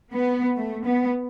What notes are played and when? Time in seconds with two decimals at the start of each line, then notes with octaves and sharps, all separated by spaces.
0.13 B3
0.57 A3
0.85 B3